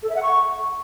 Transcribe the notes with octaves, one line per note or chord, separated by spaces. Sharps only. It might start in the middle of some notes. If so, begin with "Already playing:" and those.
A4
E5
F#5
C#6